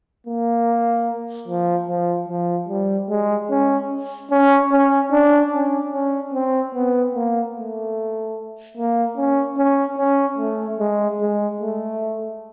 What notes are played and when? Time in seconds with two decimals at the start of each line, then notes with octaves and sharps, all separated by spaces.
0.27 A#3
1.48 F3
1.88 F3
2.29 F3
2.69 G3
3.10 G#3
3.50 C#4
4.31 C#4
4.72 C#4
5.12 D4
5.53 C#4
5.93 C#4
6.34 C4
6.74 B3
7.15 A#3
7.55 A3
8.77 A#3
9.17 C#4
9.57 C#4
9.98 C#4
10.38 A3
10.80 G#3
11.20 G#3
11.60 A3